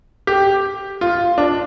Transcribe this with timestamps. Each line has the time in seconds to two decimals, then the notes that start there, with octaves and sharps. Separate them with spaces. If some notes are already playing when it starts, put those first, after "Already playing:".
0.27 G4
1.01 F4
1.38 D4